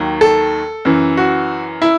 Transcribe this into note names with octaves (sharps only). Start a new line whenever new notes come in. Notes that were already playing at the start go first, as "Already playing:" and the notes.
Already playing: D#2 D#3 F#3
A4
F#2 E3
F#4
E4